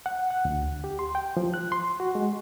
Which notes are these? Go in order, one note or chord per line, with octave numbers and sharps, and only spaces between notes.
F#5
F#5
D2
G4
C6
G5
F3
F#6
C6
F#4
G#3